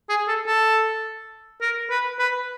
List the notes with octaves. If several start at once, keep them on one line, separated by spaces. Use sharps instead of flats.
G#4
A4
A4
A#4
B4
B4